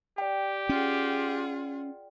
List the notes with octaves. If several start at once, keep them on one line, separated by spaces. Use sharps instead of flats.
G4 D5 G5
C#4 F4 G#4 F#5